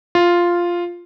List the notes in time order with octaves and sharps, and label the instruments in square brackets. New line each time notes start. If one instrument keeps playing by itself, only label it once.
[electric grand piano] F4